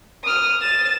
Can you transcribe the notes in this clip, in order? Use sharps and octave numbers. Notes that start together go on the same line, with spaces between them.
D#6 F6
A6 E7